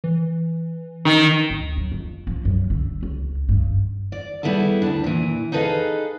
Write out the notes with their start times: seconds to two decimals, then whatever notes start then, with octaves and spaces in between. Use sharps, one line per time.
0.04 E3
1.05 D#3
1.50 D2
1.77 F#3
1.92 F2
2.27 F3
2.45 F#2
2.70 D3
3.03 C#2
3.49 G2
4.12 D5
4.43 G3 B3 E4 G#4 A4
4.82 D2 D4
5.04 A#2 E3
5.52 D#4 G#4 A4 B4 D#5 F5